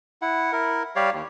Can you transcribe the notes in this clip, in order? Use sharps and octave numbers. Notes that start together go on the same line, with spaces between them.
E4 F#5
E4 A#4
G3 G4 C#5 D5 F5
D#2